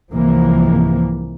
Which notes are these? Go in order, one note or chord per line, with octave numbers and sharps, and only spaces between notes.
C2 G#2 C3 E3 F3 A#3